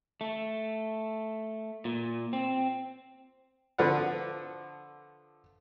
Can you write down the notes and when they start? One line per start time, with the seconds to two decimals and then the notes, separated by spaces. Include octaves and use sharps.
0.21 A3
1.85 A#2
2.33 C4
3.78 D3 F3 B4 D5 F#5